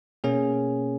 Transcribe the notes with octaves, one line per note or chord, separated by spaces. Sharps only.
B2 A#3 C#4 G#4